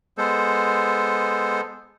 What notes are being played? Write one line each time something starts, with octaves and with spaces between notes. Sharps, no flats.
G#3 B3 A4 C5